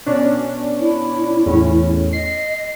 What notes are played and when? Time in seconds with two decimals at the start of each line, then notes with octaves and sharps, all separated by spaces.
0.06 B2 C#4 D4
0.80 E4
1.46 E2 A2 C#4
2.13 D#5 C7